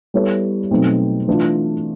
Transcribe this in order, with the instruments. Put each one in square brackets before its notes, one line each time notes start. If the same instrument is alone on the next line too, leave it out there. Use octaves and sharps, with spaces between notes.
[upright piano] G3 B3 E4 A4 C#5
B2 F#3 A3 C4 D#4
E3 A3 D4 F4 A4